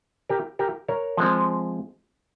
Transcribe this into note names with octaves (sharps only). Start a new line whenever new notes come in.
G4 A#4
G4 A#4
A#4 C#5
F3 G#3 C4